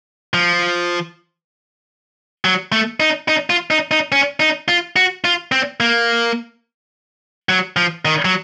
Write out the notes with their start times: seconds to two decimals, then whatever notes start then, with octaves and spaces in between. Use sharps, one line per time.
0.34 F3
2.45 F#3
2.72 A3
3.00 D#4
3.28 D#4
3.50 F4
3.70 D#4
3.91 D#4
4.12 C#4
4.40 D#4
4.68 F4
4.96 F#4
5.25 F4
5.52 C4
5.80 A#3
7.49 F#3
7.77 F3
8.05 D#3
8.25 F#3